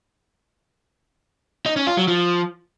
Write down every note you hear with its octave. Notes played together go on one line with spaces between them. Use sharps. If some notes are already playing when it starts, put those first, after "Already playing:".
D#4
C#4
F4
F#3
F3